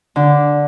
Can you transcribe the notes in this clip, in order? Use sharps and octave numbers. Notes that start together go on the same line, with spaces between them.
D3